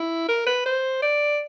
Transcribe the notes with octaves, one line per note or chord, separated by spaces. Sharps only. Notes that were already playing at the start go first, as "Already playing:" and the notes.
Already playing: E4
A#4
B4
C5
D5